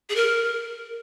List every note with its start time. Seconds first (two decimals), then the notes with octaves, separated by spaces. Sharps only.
0.10 G#4
0.16 A#4